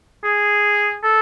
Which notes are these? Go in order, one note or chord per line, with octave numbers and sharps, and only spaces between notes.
G#4
A4